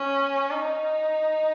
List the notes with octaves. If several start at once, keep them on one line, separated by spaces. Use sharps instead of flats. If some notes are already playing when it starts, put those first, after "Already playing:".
Already playing: C#4
D#4